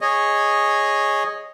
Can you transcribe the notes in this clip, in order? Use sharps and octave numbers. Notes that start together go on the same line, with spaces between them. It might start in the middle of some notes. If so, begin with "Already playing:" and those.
G#4 C#5 D#5